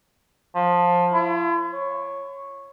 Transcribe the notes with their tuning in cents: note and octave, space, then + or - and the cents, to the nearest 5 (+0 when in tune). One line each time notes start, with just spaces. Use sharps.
F3 +15
E4 +45
C#5 -10